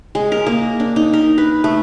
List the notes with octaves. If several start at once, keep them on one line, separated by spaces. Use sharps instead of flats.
G#3
A#4
A#3
D4
D#4
A#4
B4
A3